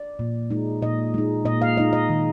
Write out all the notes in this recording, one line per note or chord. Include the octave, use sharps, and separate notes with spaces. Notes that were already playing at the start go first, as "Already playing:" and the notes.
Already playing: D5
A#2
G#3 D#4
A#2 D#5
G#3 D#4
A#2 D#5
F5
G#3 D#4 D#5
D#5
D#3